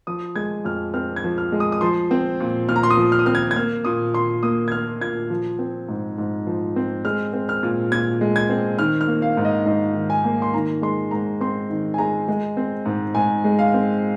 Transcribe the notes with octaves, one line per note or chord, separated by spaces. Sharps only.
F3 D#6
G#3 G#6
F2 F6
C4 F6
G#6
F3
F6
G#3
D#6
D#6
F3 C6
C4
A#2
A#2 F6
A#5
C6
D#6
F3
F6
D#6
C4 F6
G#6
G#6
A#3 F6
A#2 D#6
A#2 C6
A#3 D#6
G#6
A#3 F6
A#2 G#6
F3
C4
G#2
G#2
F3
C4
G#3 F6
C4
F6
A#2
A#2 G#6
G#3
G#6
C4
D#3 F6
F6
A#3
F5
G#2
D#5
G#2 D#5
D#3
G#5
A#3
C6
D#3 A#5
G#3 C6
G#2 A#5
C4 C6
D#3
G#5
G#3 A#5
G#3
C4
G#2
G#2 G#5
G#3
F5
C4